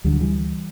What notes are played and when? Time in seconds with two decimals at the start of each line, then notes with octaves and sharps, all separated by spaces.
0.04 D2 D3 G3
0.13 F#3
0.20 E3 G3